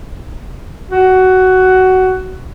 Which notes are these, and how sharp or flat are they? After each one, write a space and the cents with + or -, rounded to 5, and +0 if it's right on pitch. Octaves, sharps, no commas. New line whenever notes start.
F#4 +15